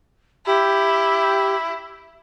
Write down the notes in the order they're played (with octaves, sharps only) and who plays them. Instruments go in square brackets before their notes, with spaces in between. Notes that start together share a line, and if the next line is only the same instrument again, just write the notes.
[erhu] E4 [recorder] G4